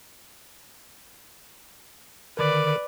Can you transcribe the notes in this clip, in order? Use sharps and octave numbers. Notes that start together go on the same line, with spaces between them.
D3 D#3 A#4 B4 D5